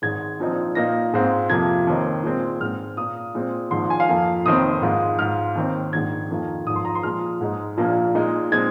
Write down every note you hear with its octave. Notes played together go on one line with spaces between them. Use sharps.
G#1 G#2 G#3 G#6
A#1 A#2 F3 C4 D#4
A#2 A#3 D#4 A#6
G#2 G#3 C4 F4
F2 C3 F3 A#3 F4 G#6
D#2 D#3 C4 D#4
A#2 G#3 C4
G#2 G#3 C4 F6
A#2 A#3 F4 D#6
A#2 G#3 C4
G#1 G#2 F3 C6
G#5
F5
F2 F3 A#3 F4
F1 D#2 D#3 C4 D#4 D#6
G#2 G#3 F4
G#2 G#3 F4 F6
D#2 D#3 C4 D#4
A#1 G#2 D#3 G#6
F2 D#3 A#3 F4
G#1 G#2 F3 D#6
C6
A#5
C6
A#2 F3 G#3 F6
G#2 G#3 D#4
A#1 A#2 F3 A#3
A#2 G#3 D#4
A#2 G#3 C4 D#4 G#6